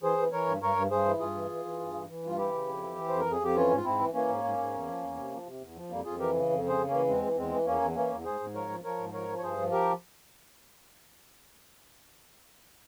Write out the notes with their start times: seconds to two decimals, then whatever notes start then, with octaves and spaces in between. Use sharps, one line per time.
0.03 E3 G#4 C5
0.18 E3
0.32 E3 A#4 C#5
0.47 G2
0.62 G2 A#4 C#5
0.76 G2
0.91 G2 G#4 C5
1.05 E3
1.20 G2 F4 G#4
1.35 E3
1.51 E3
1.65 E3
1.80 G2
1.94 E3
2.09 E3
2.23 G2 F4
2.38 E3 E4 G4
2.53 C#3
2.67 F2
2.82 E3
2.96 E3
3.09 F2 C5
3.20 A#4
3.26 F2
3.31 G#4
3.41 F2 G4
3.56 E3 C#4 F4
3.71 G#2
3.76 F4
3.84 G#2 C4 E4
4.00 E3
4.14 E3 A#3 C#4
4.29 G#2
4.43 G#2
4.58 G#2
4.73 E2
4.88 F3
5.02 E2
5.17 C3
5.32 F3
5.46 C3
5.61 E2
5.76 F3
5.90 F2 G3 A#3
6.05 F2 F4 G#4
6.20 E3 G4 A#4
6.34 C#3
6.50 F2
6.64 C#3 G#4 C5
6.78 C#3
6.88 E3 A#3 C#4
7.07 E2 G#3 C4
7.23 E3
7.37 E2 G#3 C4
7.52 E3
7.66 E2 A#3 C#4
7.81 E2
7.95 E3 A#3 C#4
8.11 E2
8.25 G#2 G#4 C5
8.40 G#2
8.55 F3 A#4 C#5
8.70 F3
8.84 F3 A#4 C#5
8.98 G#2
9.14 F3 A#4 C#5
9.28 F3
9.38 C#5
9.42 G2 G#4 C5
9.57 F3
9.72 G4 A#4